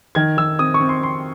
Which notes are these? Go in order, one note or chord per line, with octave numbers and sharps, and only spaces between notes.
D#3 G#6
D#3 E6
C4 D#6
C#6
C4
C6
C4 C6